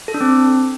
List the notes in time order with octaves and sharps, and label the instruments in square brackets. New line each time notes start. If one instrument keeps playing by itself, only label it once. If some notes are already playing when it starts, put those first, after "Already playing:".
[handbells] A4
D4
C4